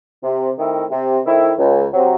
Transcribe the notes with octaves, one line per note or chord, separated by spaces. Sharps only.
C3
D#3 A3 C4 E4
C3
D#3 A3 C4 E4
C#2
C3 F#3